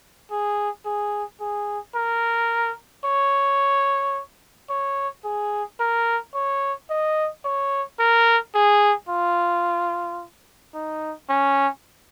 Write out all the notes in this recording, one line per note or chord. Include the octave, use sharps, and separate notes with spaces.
G#4
G#4
G#4
A#4
C#5
C#5
G#4
A#4
C#5
D#5
C#5
A#4
G#4
F4
D#4
C#4